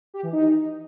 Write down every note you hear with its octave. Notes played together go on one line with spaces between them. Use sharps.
G4
E3
D#4